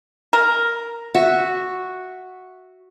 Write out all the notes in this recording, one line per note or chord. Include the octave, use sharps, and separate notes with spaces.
A#4
F#4 E5